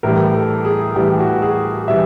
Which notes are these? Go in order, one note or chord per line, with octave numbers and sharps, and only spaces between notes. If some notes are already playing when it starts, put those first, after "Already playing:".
A2 E3 G3 A#4
A4
G#4
A2 E3 G3 G4
F#4
G#4
E3 G3 E5